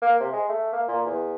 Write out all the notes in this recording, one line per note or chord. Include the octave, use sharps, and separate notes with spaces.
A#3
C3
G#3
A3
A#3
A#2
E2